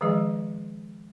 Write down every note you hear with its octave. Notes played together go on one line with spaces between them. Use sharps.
D#3 F3 G#3 G#4 D#5